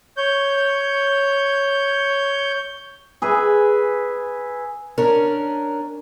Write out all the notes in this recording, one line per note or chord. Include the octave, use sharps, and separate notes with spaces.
C#5 G6
G#4 B4 E5
C#4 D4 A#4